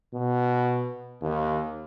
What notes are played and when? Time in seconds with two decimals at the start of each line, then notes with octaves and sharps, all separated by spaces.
0.14 B2
1.21 D#2